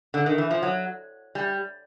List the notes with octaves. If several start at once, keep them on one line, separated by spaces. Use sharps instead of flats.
D3
D#3
E3
F3
F#3
G3